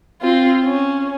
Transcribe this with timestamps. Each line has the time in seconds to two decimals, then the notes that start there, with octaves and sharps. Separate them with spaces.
0.22 C4 F4
0.64 C#4